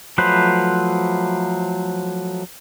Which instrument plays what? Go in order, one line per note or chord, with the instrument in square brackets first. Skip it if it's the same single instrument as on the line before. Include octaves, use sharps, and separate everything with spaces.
[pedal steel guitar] F3 F#3 A3 B4 C5